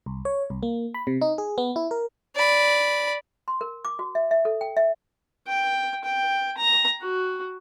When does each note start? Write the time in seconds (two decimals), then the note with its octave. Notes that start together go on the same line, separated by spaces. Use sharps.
0.06 C2
0.25 C#5
0.50 C2
0.63 A#3
0.94 B5
1.07 C3
1.21 D#4
1.38 G#4
1.58 B3
1.76 E4
1.91 A#4
2.36 D5 B5
3.48 C6
3.61 A#4
3.85 D6
3.99 F#4
4.15 E5
4.31 E5
4.45 A4
4.61 G5
4.77 E5
5.47 G5
6.04 G5
6.57 A#5
7.01 F#4